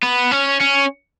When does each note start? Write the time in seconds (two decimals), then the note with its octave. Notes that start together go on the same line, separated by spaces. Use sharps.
0.03 B3
0.32 C#4
0.61 C#4